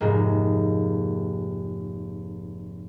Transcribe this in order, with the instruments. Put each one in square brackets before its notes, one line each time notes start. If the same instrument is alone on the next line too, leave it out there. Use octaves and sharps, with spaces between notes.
[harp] F1 G#2 A#3